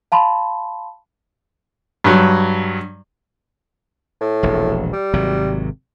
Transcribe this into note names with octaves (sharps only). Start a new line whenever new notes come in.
F5 A5 B5 C6
G2 F#3
A2
E1 A#1
G3
G#1 C3 F#3